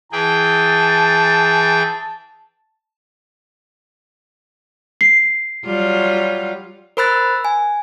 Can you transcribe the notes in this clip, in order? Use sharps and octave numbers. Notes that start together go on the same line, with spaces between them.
E3 G#4 G5 A5
C7
F#3 G3 F4
A#4 C5 B5 E6 F#6 A6
G#5